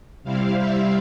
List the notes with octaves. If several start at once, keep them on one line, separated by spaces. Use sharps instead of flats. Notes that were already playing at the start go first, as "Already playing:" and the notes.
C3 G3 C4 E4 F5
E5